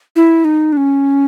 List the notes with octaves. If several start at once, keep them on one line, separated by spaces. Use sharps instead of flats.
E4
D#4
D4
C#4